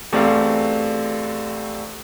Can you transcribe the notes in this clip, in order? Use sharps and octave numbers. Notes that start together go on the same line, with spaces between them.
E2 A3 C4 G4 D5 F5